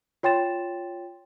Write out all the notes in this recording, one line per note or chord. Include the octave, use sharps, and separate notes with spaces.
F4 C#5 G5 C6 A6 E7